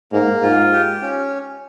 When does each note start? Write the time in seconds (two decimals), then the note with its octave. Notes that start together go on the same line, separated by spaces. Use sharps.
0.12 G#2 A#3
0.43 G#2 F4
0.73 G4
1.02 C#4